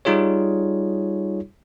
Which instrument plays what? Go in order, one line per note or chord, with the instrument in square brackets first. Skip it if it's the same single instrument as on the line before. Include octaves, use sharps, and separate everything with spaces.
[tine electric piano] G3 D#4 F4 G#4 C#5